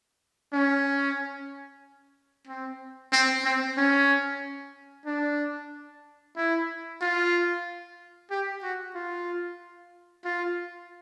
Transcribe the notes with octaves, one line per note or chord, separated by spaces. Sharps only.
C#4
C4
C4
C4
C#4
D4
E4
F4
G4
F#4
F4
F4